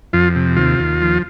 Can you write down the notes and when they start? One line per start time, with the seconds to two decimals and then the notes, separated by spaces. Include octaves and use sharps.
0.13 F2 F4
0.35 C3
0.56 D#2 F4
0.79 D#2
1.01 F3